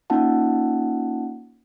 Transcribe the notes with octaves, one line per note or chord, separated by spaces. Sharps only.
A#3 C#4 D#4 F4 F#5 A5